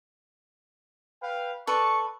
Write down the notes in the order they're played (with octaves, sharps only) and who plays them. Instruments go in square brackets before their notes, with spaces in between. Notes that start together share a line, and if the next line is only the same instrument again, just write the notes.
[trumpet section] B4 F5 G5
[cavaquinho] A4 B4 [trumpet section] D5 C#6